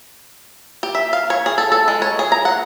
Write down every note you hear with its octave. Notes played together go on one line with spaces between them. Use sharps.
G4
E5
F5
C#5
G#4
A4
A4
G#3
C#5
G#4
A#5
F#5